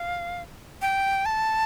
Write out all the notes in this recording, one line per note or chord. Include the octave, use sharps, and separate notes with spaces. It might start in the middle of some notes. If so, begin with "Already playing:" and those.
Already playing: F5
G5
A5